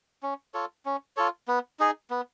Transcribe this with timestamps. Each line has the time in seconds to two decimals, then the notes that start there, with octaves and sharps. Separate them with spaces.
0.23 C#4
0.54 F4 A4 C#5
0.85 C#4
1.17 F4 A4 C#5
1.48 B3
1.80 D#4 G#4
2.10 B3